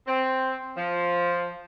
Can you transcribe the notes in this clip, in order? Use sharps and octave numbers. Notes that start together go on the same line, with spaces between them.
C4
F3